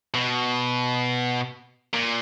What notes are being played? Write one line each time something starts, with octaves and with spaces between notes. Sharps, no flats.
B2
A#2